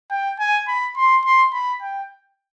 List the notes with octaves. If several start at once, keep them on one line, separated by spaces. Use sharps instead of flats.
G5
G#5
B5
C6
C6
B5
G5